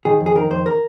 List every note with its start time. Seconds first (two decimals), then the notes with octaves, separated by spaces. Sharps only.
0.05 D#3 G#4
0.20 F2
0.26 G#4
0.35 D#3 A#4
0.50 F2 C5
0.66 A#4